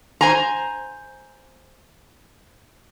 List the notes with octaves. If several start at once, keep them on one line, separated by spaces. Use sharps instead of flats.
C5 G#5 A#5